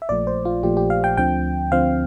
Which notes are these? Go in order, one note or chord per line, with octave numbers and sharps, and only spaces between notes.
E5
A#1 A#2 F3 A3 D5
C5
F4
A#1 A#2 F3 A3 G4
G4
F5
G5
D2 D3 F3 C4 G5
D2 D3 F3 C4 F5